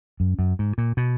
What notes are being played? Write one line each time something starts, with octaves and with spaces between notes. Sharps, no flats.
F#2
F#2
G#2
A#2
B2